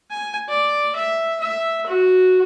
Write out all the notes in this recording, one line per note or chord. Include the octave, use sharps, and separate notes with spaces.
G#5
D5
E5
E5
F#4